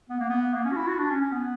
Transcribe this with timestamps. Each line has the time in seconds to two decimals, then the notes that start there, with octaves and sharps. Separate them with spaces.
0.09 B3
0.20 A#3
0.30 B3
0.54 A#3
0.65 C#4
0.72 F#4
0.76 E4
0.87 F#4
0.98 D4
1.10 C#4
1.21 C#4
1.32 B3